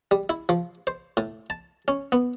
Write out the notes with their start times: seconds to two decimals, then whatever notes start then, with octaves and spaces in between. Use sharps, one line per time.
0.11 G3
0.29 E4
0.49 F3
0.87 C5
1.17 A2
1.50 A5
1.88 C#4
2.12 B3